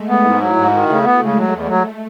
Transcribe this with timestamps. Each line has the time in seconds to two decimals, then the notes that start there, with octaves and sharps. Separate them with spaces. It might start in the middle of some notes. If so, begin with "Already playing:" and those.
Already playing: G#3 A3
0.08 B3
0.24 G#2 E4
0.40 F#3
0.56 G#2 F#4
0.72 D#3
0.88 C#3 A3
1.04 B3
1.21 C#3 G#3
1.37 F#3
1.53 E2 A3
1.68 F#3